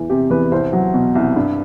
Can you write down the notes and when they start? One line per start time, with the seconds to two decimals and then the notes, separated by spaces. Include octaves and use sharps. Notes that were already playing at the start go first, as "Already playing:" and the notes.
Already playing: E2 E3
0.10 C3 G4
0.30 E2 B4
0.52 C2 C5
0.73 F#3
0.94 B2
1.15 C2
1.36 G2